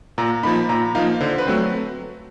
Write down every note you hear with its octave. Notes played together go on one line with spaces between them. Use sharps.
A#2 A#5
F3 A#3 D#4 B5
A#2 A#5
F3 A#3 D#4 F5
D3 C5
B4
F#3 A3 C4